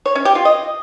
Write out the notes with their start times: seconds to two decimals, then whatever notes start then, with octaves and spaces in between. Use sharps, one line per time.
0.06 C#5
0.15 C#4
0.25 G4
0.35 F4
0.45 D#5